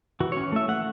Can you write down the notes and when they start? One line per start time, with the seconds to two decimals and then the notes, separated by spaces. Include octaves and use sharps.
0.20 E3 F#4
0.32 C#5
0.37 C#4
0.52 A3 E5
0.68 A3 F#5